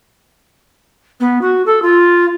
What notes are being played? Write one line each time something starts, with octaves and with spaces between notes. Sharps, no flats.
B3
F#4
A4
F4